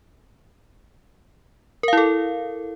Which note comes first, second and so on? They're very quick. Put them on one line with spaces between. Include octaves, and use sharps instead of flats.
A#4 F5 E4 A4